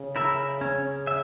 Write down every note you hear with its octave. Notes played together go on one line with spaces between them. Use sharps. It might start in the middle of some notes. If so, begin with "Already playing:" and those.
Already playing: C#3
E4 A#4 E5
C#4
E5